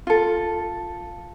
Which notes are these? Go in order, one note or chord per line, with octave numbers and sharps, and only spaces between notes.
F4 A4